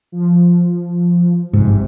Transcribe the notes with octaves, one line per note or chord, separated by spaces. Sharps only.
F3
G1 G#2 C3